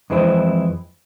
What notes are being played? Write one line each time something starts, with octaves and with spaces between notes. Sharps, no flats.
F2 E3 G#3 C4 E4